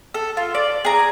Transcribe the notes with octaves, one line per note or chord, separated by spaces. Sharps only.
A4
F4
D5
G#4 A#5